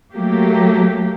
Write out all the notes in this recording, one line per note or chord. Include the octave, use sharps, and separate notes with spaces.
F#3 A3 A#3 G4